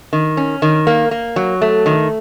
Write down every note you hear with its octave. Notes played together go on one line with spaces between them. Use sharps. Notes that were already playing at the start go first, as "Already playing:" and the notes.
D#3
C#4
D#3
A#3
A#3
F#3
A3
D#3